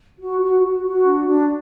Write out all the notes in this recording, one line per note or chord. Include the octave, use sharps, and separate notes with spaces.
F#4
F#4
F#4
F#4
D4
D4